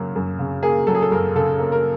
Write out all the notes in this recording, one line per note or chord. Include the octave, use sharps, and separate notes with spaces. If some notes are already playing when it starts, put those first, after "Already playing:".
Already playing: F#2 C#3 F#3 A#3
F#2
C#3
A#3 G#4
F#3 A4
G#4
A4
F#2 A#4
C#3 A4
A#3
A#4